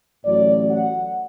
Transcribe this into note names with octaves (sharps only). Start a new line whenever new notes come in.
A1 A2 F#3 D5
F#5